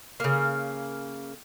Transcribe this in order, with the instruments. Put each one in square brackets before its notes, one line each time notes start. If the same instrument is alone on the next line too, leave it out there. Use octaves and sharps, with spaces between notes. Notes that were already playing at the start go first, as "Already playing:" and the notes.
[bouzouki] C#3 A#3